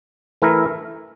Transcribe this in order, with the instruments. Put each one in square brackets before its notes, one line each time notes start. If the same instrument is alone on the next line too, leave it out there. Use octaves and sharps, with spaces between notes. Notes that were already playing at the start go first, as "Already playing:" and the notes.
[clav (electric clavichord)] E3 A3 E4 A#4